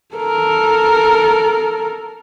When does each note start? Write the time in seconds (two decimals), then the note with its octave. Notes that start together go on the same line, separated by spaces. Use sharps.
0.15 A4 A#4